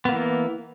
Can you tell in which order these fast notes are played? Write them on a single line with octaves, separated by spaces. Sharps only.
B3 A#3 E3